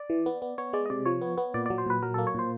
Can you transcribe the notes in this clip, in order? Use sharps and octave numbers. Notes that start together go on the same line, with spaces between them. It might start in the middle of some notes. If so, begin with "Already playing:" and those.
Already playing: D5
E3
B3
B3
B3 C#5
G#3 D5
D#5
C3 D5
F3 C#5
B3
B3
A#2 D5
F#3 D5
C5
A#2 B4
F#3 A#4
A#3 A4
C#5
A#2 C5